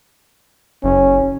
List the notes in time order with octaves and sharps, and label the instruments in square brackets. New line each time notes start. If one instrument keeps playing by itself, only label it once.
[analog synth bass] F#1 [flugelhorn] C#4